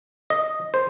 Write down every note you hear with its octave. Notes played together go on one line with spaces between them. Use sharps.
D#5
C5